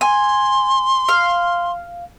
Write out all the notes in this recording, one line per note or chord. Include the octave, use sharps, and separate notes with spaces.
G#5 C6
F5